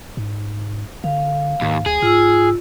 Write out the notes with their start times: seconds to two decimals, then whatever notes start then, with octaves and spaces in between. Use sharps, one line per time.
0.17 G#2
1.04 D3 F5
1.61 D#2 G#2
1.86 D2 G#4
2.02 G#2 F4 E6